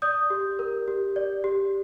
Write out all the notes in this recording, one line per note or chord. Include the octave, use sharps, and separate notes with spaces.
D5 D#6 G6
G4
A#4
G4
D5
G4